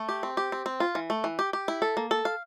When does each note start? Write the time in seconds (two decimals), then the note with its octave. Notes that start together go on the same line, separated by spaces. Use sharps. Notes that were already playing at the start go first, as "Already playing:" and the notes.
Already playing: A3
0.09 G4
0.23 C4
0.37 G4
0.52 C4
0.66 C4
0.80 F4
0.95 E3
1.10 A3
1.24 E3
1.39 G4
1.53 G4
1.68 E4
1.82 A4
1.97 A#3
2.11 A4
2.25 F5